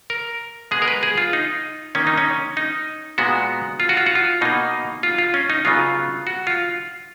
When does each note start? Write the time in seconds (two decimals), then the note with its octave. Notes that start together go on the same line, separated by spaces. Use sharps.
0.10 A#4
0.71 B2 G#3 B3 G#4
0.82 A#4
0.88 B4
1.03 G#4
1.18 F4
1.33 D#4
1.95 D#3 A#3 C#4
2.07 D#4
2.17 C#4
2.57 D#4
3.18 A#2 G#3 B3 F#4
3.80 F4
3.89 F#4
3.97 F4
4.06 F#4
4.15 F4
4.41 B2 A#3 D#4
5.03 F4
5.18 F4
5.34 C#4
5.50 D#4
5.65 C#3 F#3 B3 F4
6.27 F#4
6.47 F4